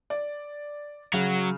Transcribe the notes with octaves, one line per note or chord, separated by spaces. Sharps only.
D5
C#3 F#3